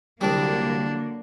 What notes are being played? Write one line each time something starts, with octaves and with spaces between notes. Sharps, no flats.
C2 D3 F#3 G3 A#3 D4